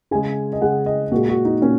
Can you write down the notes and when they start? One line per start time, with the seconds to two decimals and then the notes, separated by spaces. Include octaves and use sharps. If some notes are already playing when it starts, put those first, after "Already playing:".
0.11 C#3 G#3 G#5
0.53 D#5
0.62 C#3 G#3 F#5
0.86 D#5
1.12 A#2 G#3 F#4
1.29 F#4
1.45 D#4
1.62 A#2 C#4